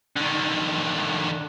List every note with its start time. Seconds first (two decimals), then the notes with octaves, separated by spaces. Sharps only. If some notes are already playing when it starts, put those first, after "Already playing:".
0.16 D3 D#3